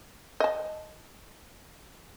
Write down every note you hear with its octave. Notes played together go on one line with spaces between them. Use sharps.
D#5 A5